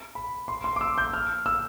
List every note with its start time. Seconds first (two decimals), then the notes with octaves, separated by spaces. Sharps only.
0.15 B5
0.48 C6
0.64 C6
0.76 D6
0.81 E6
0.98 G6
1.13 F6
1.46 E6